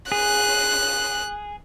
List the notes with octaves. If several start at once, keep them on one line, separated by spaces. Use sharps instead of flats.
G#4 F#6